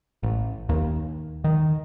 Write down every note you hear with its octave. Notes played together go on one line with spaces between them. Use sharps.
A1
D#2
D#3